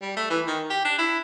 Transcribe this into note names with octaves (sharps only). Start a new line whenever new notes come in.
G3
A3
E3
D#3
G4
D4
E4